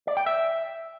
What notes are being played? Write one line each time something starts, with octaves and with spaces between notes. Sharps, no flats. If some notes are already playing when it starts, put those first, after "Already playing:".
D5
G5
E5